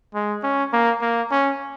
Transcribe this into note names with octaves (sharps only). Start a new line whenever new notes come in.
G#3
C#4
A#3
A#3
C#4